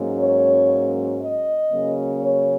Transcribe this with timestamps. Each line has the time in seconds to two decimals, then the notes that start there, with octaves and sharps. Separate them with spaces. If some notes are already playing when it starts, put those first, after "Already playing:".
Already playing: G#2 F#3 A#3 C#4
0.18 C#5
1.20 D#5
1.71 C#3 F#3 A#3 C#4
2.22 C#5